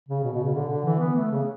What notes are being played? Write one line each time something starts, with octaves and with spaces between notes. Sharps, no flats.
C#3
B2
B2
C#3
D3
D3
E3
B3
A3
C#3